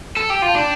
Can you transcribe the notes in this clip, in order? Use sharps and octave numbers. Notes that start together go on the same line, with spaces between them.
A4
A5
G4 G5
F4
A5
D4